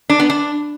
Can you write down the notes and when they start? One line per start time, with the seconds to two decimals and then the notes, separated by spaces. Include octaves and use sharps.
0.10 D4
0.20 B3
0.30 D4